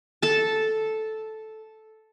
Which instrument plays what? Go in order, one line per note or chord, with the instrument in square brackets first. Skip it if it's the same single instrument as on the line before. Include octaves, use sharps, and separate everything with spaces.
[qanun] A4 A5